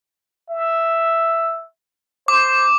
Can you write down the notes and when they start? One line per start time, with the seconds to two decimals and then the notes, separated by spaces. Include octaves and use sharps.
0.50 E5
2.28 C5 D6